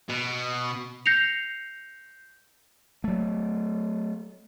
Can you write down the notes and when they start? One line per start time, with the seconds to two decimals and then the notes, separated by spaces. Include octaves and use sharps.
0.09 B2
1.06 G6 A#6 C7 C#7 F7
3.04 F#3 A3